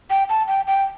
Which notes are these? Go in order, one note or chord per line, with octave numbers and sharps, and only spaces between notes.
G5
A5
G5
G5